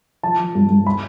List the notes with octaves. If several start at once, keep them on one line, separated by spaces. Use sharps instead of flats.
F3 A5
F3
G2
G2
B5